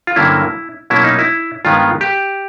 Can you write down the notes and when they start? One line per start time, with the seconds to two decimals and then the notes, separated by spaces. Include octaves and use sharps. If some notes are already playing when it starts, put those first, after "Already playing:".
0.07 F4
0.16 G2 D3 F#3 A#3 C#4 E4
0.90 B2 F#3 A#3 C#4 E4
1.04 D#4
1.19 E4
1.65 G2 D#3 G#3 B3 F4
2.01 G4